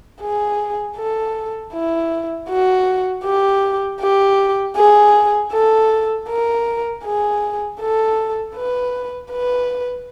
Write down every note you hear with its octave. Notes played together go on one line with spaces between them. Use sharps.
G#4
A4
E4
F#4
G4
G4
G#4
A4
A#4
G#4
A4
B4
B4